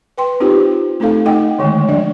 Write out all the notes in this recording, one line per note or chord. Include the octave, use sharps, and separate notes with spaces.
B4 G5 C6
C4 D#4 F4 G4 C5
A3 C4 D#4 A4 F5
A3 D#4 D#5 F#5 G5
D3 D#3 G#3 A3
F3 F#3 D4 D5